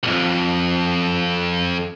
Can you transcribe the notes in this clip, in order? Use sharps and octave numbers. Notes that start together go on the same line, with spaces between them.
B1 F2